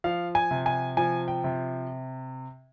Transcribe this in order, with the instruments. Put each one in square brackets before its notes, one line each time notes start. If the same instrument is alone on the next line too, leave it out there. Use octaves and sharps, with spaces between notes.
[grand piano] F3 F5
G#5
C3
G#5
F3 G#5
G5
C3